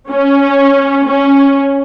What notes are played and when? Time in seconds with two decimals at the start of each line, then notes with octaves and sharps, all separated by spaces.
0.11 C#4
1.08 C#4